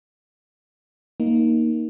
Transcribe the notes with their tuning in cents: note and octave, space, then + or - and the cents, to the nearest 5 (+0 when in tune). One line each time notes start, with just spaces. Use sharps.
A#3 +5 D#4 +10